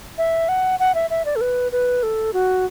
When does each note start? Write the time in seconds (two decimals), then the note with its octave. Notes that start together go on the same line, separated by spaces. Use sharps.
0.18 E5
0.49 F#5
0.80 F#5
0.95 E5
1.10 E5
1.25 D5
1.36 A4
1.41 B4
1.72 B4
2.03 A4
2.33 F#4